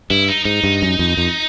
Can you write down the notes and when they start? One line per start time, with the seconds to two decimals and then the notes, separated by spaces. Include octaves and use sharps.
0.10 G2 E4
0.29 D#4
0.45 G#2 D#4
0.64 G2
0.82 F#2
0.99 F2
1.17 F2